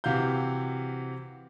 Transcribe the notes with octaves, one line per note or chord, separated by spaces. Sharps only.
C3 E3 F#4 F5 G6